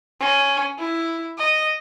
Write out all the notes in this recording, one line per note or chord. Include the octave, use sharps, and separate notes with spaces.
C#4
E4
D#5